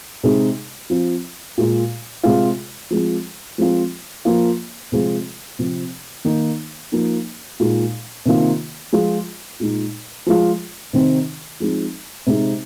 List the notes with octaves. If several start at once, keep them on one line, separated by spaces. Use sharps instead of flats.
C3 G#3 D#4
F3 C4 F4
A#2 G#3 F4
C3 G#3 F4
F3 G#3 C4 F4
F3 G#3 C4 F4
F3 A#3 F4
C3 F3 G#3 C4 F4
C3 F3 C4
D#3 A#3 D#4
F3 A#3 D#4
A#2 G#3 D#4
C3 D#3 A#3 F4
F3 G#3 F4
A#2 G#3 D#4
F3 G#3 F4
C3 D#3 C4 D#4
F3 G#3 C4 D#4
C3 G#3 C4 D#4